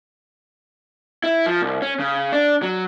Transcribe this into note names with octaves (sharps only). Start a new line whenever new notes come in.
E4
F3
C2
C#4
C#3
D4
F#3